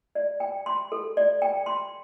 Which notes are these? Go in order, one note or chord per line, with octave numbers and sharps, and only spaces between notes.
D5
G5
C6
A4
D5
G5
C6